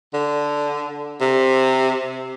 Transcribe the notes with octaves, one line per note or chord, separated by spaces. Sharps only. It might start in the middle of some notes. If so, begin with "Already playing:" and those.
D3
C3